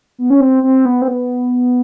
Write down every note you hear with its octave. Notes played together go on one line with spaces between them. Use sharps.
B3
C#4
C4
C4
B3
C4
B3